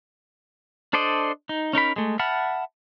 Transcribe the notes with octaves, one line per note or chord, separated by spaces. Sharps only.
D4 A4 C5 D5 D#5
D#4
C#4 D#4 A#4 B5
G#3 A3
E5 F#5 A5 B5 F6